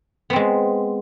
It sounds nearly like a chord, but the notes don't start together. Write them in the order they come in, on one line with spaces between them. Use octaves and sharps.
B3 C4 G#3